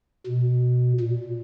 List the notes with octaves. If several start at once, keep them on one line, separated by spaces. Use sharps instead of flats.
B2
A#2